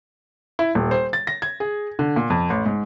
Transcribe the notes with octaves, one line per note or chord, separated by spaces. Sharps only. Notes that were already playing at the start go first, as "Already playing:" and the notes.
E4
D#1
C5
A6
A#6
G#6
G#4
D3
A#2
F2
A1
G#2